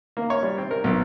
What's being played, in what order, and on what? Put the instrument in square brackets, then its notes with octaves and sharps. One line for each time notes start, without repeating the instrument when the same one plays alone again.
[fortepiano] A#3
C#5
G3
C4
A#4
B1